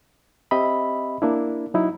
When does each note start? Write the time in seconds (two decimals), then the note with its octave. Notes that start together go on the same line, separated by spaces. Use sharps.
0.51 C4 G4 D#5 E5 B5
1.22 A#3 D4 E4
1.74 F#3 D#4 E4